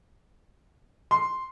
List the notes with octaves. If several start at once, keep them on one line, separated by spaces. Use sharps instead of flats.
C6